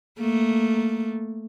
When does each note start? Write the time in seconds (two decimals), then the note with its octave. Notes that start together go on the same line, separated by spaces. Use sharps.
0.19 A3 A#3